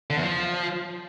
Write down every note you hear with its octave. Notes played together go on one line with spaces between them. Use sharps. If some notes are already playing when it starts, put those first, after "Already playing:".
D3
E2
F3